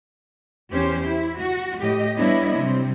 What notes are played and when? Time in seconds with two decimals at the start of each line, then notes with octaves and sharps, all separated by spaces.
0.71 E2 C#4 G4 C5
1.06 E4
1.39 F#4
1.81 A2 G4 D#5
2.18 G3 B3 D4 E4 C#5 D#5
2.59 C3 G3 C4